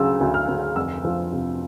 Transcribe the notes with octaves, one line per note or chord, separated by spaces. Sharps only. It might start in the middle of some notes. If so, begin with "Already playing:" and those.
Already playing: D2 C#3 F#3 E6
D2
F6
D2
F1 E6
F3
C3